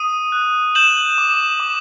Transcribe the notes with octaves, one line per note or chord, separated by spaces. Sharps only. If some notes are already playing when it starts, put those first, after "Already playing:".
Already playing: D#6 D#7
F#6
G6 E7 F#7
D6
D6